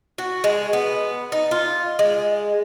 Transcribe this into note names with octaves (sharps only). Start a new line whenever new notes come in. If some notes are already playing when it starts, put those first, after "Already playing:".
F#4
G#3
B3
D#4
F4
G#3